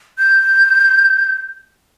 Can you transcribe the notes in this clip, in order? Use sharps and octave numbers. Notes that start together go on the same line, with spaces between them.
G6